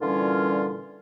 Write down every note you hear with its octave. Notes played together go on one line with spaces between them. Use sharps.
A#2 D3 E3 G3 C#4 F4